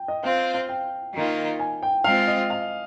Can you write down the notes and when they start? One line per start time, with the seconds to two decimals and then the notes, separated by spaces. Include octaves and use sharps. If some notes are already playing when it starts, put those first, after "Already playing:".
Already playing: G5
0.08 D#5
0.23 C4 F4 C5 F5
0.54 F5
0.69 G5
1.14 D#3 A#3 F4
1.59 G#5
1.83 G5
2.04 G#3 C4 F4 F5
2.28 D#5
2.50 F5